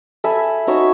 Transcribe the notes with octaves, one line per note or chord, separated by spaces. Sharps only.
A4 E5 G#5 B5
D#4 F#4 C#5 E5